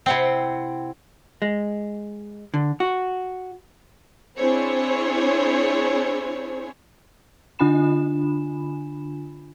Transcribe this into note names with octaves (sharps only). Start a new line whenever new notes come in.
C3 C4 E4 F#5 G5
G#3
D3
F#4
C4 D4 E4 G#4 C5 C#5
D3 D4 F4 G#5 B5 E7